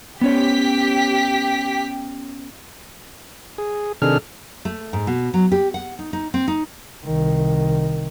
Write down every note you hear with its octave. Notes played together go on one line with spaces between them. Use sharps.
B3 C#4 G4 C#5 B6
G#4
C3 D#3 D4 G#4 A4 F6
A3
G#2
B2
F#3
G4
F#5
D#4
D#4
C4
D#4
C2 D#3